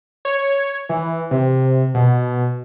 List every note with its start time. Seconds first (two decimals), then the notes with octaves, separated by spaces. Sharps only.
0.25 C#5
0.89 E3
1.31 C3
1.94 B2